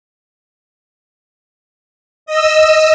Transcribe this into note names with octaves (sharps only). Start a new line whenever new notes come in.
D#5 E6